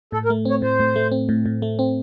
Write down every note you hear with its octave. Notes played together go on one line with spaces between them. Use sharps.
A2 A4
A#4
A3
C4 C#5
A2 C5
A2
A3
C4
A2
A2
A3
C4